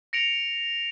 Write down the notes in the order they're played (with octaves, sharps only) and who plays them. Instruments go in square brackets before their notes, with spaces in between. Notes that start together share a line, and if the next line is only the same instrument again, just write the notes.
[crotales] A#6 C#7 D7 F7